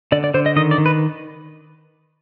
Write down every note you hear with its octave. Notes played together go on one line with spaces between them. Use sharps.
D3 D5
D5
D3 C5
D#5
D#3 D#5
D5
D#3
B4